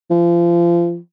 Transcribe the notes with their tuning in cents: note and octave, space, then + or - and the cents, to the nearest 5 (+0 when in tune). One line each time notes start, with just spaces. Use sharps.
F3 -30